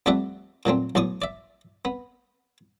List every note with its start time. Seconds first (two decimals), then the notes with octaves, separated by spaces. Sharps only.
0.06 F2 G3 A3 D5 E5 F#5
0.65 A#2 F#3 A3 C4
0.95 B1 A2 D5 C#6 D#6
1.22 D5 E5
1.85 B3